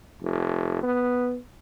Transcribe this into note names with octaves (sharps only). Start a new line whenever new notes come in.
F1
B3